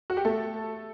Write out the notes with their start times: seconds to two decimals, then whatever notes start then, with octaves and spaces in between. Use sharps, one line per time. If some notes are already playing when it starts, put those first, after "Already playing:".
0.10 F#4
0.17 G4
0.25 A3 A4